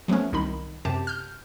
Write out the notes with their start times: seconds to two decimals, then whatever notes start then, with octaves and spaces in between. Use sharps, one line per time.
0.08 F3 F#3 A3 B3 C#4
0.33 C2 D#3 D#4 B5
0.85 F#2 C3 G4 A5
1.07 F6 G6